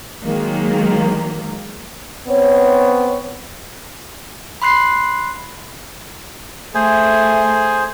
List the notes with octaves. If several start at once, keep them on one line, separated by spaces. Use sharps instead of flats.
D#3 F#3 G#3 A#3
B3 C4 C#5
B5 C6 F#6 C7
A3 G#4 C5 G#5